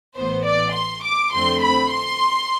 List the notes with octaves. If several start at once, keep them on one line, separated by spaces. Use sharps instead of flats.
A1 A2 E3 B3 C5
D5
C6
D6
F2 D3 A3 C4 C6
B5
C6